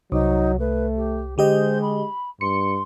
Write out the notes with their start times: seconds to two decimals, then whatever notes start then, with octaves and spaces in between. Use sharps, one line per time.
0.12 C2 F#3 D#4
0.59 A3 B4
0.96 G4
1.38 D3 G#3 G4 C5 D#5
1.82 B5
2.41 G2 C6 C#7